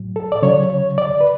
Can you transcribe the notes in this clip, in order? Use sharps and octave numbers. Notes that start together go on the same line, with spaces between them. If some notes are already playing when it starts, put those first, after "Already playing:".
Already playing: A2 F#3
A4
D5
C#3 F#3 C#5
C#5
D5
B4